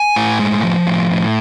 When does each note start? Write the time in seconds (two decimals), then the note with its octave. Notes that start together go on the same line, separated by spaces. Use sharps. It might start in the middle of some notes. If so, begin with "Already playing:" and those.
Already playing: G#5
0.16 A2
0.39 G#3
0.63 F3
0.87 A2
1.11 A2